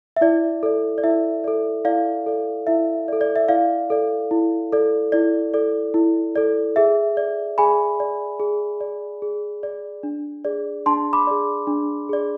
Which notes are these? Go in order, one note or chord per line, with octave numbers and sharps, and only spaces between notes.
E5
E4 D5
A4 D5
D5
E4 E5
A4 D5
E4 D5 F5
A4 D5
E4 E5
D5
A4
D5
E5
E4 D5 F5
A4 D5
E4
A4 D5
E4 D5
A4 D5
E4
A4 D5
G#4 E5
D5
G#4 G#5 B5
D5
G#4
D5
G#4
D5
D4
G#4 D5
D4 A5 C6
B5 D6
G#4 D5
D4
G#4 D5